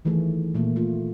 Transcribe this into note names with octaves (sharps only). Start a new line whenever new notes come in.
D#3 E3 F#3 A3 G#4
A#2 A3 A#3
A3 F4